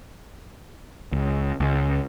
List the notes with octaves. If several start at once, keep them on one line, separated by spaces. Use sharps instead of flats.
C#2
C#2